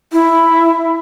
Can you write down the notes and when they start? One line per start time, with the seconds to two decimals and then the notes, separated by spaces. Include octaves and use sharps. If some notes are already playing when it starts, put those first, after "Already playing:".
0.13 E4